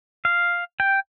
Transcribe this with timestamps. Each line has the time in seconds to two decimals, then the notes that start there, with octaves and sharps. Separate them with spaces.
0.25 F5
0.80 G5